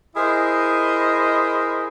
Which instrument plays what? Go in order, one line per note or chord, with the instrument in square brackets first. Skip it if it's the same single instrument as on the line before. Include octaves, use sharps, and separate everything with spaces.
[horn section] E4 G#4 A#4 C5 D#5